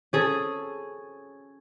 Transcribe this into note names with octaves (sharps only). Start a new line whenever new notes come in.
C#4 G#4 A4